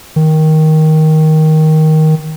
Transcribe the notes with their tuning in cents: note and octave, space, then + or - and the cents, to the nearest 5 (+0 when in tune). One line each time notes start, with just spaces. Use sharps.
D#3 +10